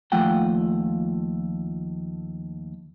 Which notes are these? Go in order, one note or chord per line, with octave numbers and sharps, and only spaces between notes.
D#2 F3 A3 F4 F#5 G5